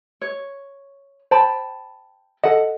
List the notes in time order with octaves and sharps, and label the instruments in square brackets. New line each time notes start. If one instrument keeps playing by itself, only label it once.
[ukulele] C#5
[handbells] C5 [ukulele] G5 A5 B5
[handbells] A4 D#5 [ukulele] F#5